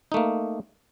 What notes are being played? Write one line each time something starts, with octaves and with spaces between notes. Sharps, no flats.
A3 A#3 D#4